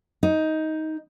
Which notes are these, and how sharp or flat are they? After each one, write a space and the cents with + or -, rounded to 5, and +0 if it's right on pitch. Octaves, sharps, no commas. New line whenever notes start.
D#4 +15